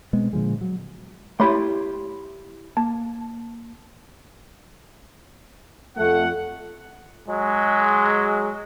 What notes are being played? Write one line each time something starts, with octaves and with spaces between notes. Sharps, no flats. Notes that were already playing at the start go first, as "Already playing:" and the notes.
B2 G#3 B3 C4
A#2 D3 F3 G#3
F#3
A3 E4 G4 C#5 B5 C6
A#3 A5
F2 A3 F#5
F#3 G#3